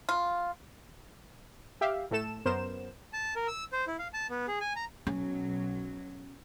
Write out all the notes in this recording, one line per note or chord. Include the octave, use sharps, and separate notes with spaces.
F4
G4 E5 F5
A2 A3 A4 E7
F#2 B3 A#4 C5 E7
A5
A#4
E6
C5
E4
F5
A5
B3
G#4
G#5
A#5
B1 F#3 C#4